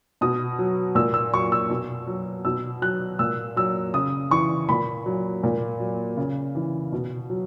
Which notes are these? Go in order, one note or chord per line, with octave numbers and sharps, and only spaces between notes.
B2 D#6
F#3
A#2 E6
E6
F#3 C#6
E6
B2
F#3
B2 E6
F#3 F#6
A#2 E6
F#3 E6
C#3 D#6
E3 C#6
A#2 B5
F#3
A#2
F#3
C#3
E3
B2
F#3